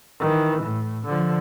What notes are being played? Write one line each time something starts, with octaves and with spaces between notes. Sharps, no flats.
D#3 E3
A2
D3 F3